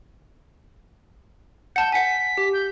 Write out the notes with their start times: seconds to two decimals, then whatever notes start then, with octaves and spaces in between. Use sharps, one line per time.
1.76 F#5 A5 G6
1.92 F#5 G#5 B6
2.37 G4
2.53 G6